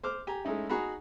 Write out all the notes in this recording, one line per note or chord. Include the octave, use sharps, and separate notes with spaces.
C5 D6 F6
G4 G#5 A#5
G#3 A3 C#4 D#4 E4
D#4 F#4 G#4 F#5 A#5 B5